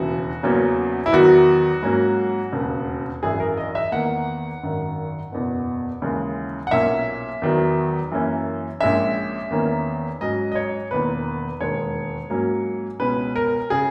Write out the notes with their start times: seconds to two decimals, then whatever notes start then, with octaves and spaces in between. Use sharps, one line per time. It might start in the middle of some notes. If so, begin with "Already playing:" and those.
Already playing: E1 D#2 C#3 E3 F#4
0.43 E2 C#3 F#3 A#3 C#4
1.06 E4
1.12 E2 D#3 F#3 F#4
1.83 G#2 F#3 A#3 C#4
2.52 E1 D#2 C#3
3.22 G#1 F#2 E3 G#4
3.40 A#4
3.57 D#5
3.75 E5
3.92 E2 D#3 A#3 F#5
4.63 G#1 F#2 D#3
5.32 F#1 E2 B2
6.02 D#2 C#3 E3 G#3
6.67 F#5
6.71 B1 A#2 A#3 C#4 E5
7.42 E2 D#3 F#3
8.11 F#2 E3 A#3 C#4
8.80 A#1 A#2 G#3 C#4 E5
9.50 E2 D#3 A#3 C#4
10.21 G#2 F#3 C#4 D#5
10.52 D#5
10.55 C#5
10.90 E1 E2 D#3 A#3 B4
11.61 E1 D#2 D#3 G#3 C#5
12.30 G#2 F#3 A#3 C#4
13.00 C#2 B2 G#3 C#4 B4
13.36 A#4
13.70 C#3 G#4